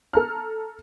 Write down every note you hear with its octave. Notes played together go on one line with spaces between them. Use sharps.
A4 A#5 F6